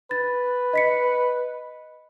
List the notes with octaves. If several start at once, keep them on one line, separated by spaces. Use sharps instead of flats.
B4 A6
D#5 B6 C#7